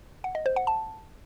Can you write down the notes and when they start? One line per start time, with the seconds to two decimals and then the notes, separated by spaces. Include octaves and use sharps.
0.24 F#5
0.35 D#5
0.46 C5
0.56 F#5
0.67 A5